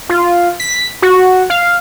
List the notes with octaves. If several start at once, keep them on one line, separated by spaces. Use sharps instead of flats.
F4
B6
F#4
F5